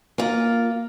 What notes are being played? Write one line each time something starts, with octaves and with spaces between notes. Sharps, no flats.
A#3 F4